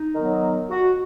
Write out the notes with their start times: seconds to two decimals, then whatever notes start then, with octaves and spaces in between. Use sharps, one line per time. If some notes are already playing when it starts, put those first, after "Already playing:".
Already playing: D#4
0.15 D#3 F#3 B3
0.69 F#4